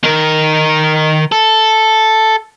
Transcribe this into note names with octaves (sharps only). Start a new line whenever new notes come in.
D#3 A#4
A4